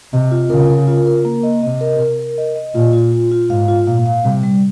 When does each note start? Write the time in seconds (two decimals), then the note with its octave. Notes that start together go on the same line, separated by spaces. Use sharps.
0.13 C3 D#5
0.31 F4
0.50 C#3 A#4
0.70 A#4
0.87 F4
1.07 A#4
1.25 A#3
1.43 D#5
1.62 C3 D#5
1.81 A#4
2.00 A#4
2.19 A#4
2.38 D#5
2.56 D#5
2.75 A#2 F4
2.93 F4
3.12 F4
3.32 F4
3.50 G#2 F5
3.68 F4
3.87 A#2 F5
4.06 F5
4.24 C3 G3
4.43 G3